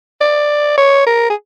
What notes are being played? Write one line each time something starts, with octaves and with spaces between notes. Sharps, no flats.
D5
C#5
A#4
G#4